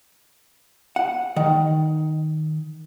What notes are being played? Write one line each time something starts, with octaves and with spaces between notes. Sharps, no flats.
F#5
D#3